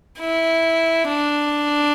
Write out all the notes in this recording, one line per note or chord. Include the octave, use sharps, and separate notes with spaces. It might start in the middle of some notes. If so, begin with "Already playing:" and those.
E4
D4